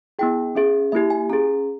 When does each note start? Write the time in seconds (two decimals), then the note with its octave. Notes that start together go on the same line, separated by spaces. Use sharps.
0.19 B3 E4 G#4 G5
0.55 C#4 G#4 E5
0.92 A#3 E4 G4 E5
1.10 G#5
1.30 C#4 G#4 A#5